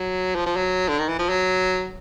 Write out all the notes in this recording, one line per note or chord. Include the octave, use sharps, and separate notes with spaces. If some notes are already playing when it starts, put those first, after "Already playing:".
Already playing: F#3
F3
F3
F#3
D3
D#3
E3
F3
F#3